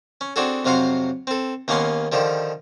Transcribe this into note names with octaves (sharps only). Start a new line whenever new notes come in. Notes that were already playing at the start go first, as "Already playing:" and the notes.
C#4
C4 D4 F#4 G#4 A4
F2 C3 F#3 F5 F#5 C6
C4 A4
D#2 A#3 B3 C#4 B4 C6
D3 D#3 F3 G3